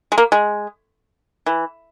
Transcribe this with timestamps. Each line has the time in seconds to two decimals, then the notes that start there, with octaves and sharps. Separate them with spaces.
0.12 G#3
0.18 A#3
0.32 G#3
1.46 E3